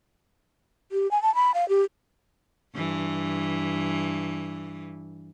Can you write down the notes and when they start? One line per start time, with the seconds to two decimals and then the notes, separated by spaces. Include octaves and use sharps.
0.92 G4
1.11 G#5
1.22 A5
1.35 B5
1.54 F5
1.69 G4
2.75 G2 E3